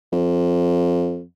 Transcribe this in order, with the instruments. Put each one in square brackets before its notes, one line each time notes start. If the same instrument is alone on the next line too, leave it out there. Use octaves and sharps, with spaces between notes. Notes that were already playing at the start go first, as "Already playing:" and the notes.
[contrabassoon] F2